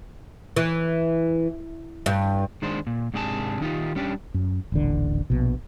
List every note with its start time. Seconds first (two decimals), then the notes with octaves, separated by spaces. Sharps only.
0.56 E3
2.06 G2
2.62 D#3 G#3 D4 C5
2.87 A#2
3.14 G#2 C3 D4 G#4 B4 A5
3.61 D#3 D#4 F4 G4
3.95 G3 C#4 D4 G4
4.34 F#2
4.72 D#1 A1 D3
5.30 A#1 B2